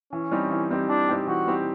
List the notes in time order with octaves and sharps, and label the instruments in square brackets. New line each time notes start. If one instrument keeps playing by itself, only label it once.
[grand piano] E3 [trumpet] C#4
[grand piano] G3 C4 D#4 G4
E3
G3 C4 D#4 G4
[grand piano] E3 [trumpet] D4
[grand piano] G3 C4 D#4 G4
[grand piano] E3 [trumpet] F#4
[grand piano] G3 C4 D#4 G4